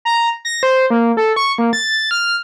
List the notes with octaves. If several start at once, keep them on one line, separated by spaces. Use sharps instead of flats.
A#5
A#6
C5
A#3
A4
C#6
A#3
A6
F6